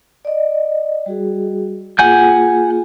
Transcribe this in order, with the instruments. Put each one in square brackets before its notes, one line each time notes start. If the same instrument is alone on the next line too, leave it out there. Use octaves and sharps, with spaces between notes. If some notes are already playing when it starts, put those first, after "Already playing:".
[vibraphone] D5 D#5
G3 F#4 G#4
[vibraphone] A#3 F4 G#4 [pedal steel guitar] F#5 G#5 G6